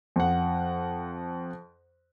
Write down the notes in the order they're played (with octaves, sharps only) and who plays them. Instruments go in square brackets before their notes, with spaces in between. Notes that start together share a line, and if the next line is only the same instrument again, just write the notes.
[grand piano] F2 F#5